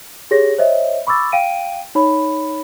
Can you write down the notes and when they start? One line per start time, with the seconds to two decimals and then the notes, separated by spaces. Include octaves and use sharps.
0.31 G4 G#4 C#5 A#6
0.59 C5 C#5 D#5 E5
1.07 B5 C#6 D6 E6 A6
1.32 F5 G5 D7 D#7
1.95 D#4 C#5 B5